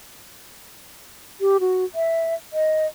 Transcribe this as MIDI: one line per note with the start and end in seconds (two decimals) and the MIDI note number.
1.41 1.57 67
1.60 1.85 66
1.95 2.35 76
2.53 2.87 75